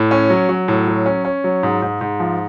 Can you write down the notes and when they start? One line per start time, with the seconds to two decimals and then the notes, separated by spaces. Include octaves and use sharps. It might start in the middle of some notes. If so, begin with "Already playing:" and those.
Already playing: A2
0.11 C#4
0.30 F#3
0.49 F#3
0.68 A2
0.87 F#3
1.06 C#4
1.25 C#4
1.44 F#3
1.63 G#2
1.82 G#2
2.01 G#2
2.20 F3